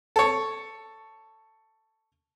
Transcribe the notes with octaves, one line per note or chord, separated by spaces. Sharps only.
A4 C#5